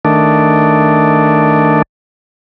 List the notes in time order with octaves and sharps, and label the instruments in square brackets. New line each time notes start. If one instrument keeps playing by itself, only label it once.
[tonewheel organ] D#3 A3 D4